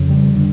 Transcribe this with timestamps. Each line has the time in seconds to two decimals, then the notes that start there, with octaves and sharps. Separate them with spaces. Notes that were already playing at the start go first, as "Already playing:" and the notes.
Already playing: F2 C#3
0.10 G3
0.35 D3